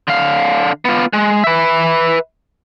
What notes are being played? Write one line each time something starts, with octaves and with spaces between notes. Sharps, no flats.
D3 F5
B3 F4
G#3
B4 E5